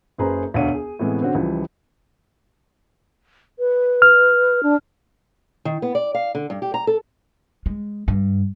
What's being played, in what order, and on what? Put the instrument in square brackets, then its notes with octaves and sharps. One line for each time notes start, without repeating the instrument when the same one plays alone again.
[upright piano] F#1 F#2 G#4 B4 C5 A#5
E1 D2 D4 C#5 F5 D#7
G#4
A2 C3 E3 G#3 B3
D3 C4 C#4 F#4
C#2 E3 F3 G3
[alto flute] B4
[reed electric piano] F6
[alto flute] D4
[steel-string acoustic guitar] D#3
B3
D5
F5
D3
G2
G4
A#5
A4
[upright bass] G#3
G2